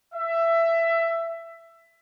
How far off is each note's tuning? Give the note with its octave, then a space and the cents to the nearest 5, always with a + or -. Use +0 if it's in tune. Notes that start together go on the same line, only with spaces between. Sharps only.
E5 +15